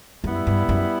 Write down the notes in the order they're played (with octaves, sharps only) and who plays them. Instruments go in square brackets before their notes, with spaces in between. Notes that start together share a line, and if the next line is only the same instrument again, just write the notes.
[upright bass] F#2 [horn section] G3 B3 E4
[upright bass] G2
F#2